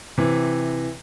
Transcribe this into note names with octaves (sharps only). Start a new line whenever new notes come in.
C3 E3